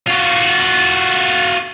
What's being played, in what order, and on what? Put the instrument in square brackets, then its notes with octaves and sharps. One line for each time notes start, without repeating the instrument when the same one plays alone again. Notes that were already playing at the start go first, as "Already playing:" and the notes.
[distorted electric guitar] F4 F#4